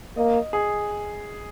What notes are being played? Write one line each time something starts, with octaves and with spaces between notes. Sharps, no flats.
A#3 D#5
G#4